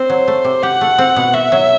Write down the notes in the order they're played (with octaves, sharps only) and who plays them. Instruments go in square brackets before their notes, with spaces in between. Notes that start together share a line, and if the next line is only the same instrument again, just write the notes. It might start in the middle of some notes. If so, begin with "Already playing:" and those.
Already playing: [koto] C4 [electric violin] C5
[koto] F#3
A3
C3
[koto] G4 [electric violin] F#5
[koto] A3
C4
B2
[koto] F#4 [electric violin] E5
[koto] F#3